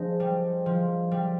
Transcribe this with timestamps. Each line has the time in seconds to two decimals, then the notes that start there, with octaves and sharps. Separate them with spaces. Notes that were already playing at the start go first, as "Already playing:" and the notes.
Already playing: F3 D4 G#4 C5 D#5
0.20 G3
0.66 F3
1.11 G3